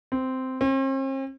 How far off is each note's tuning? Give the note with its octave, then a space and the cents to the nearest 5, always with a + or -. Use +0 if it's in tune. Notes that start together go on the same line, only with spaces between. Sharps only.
C4 -10
C4 +45